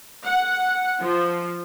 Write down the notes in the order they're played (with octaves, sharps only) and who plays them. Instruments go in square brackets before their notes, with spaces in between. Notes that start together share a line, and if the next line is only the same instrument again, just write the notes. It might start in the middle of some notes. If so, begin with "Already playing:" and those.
[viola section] F#5
F3